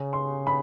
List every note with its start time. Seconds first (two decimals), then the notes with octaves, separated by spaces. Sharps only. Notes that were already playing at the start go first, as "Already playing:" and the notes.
Already playing: C#3
0.13 C6
0.47 B5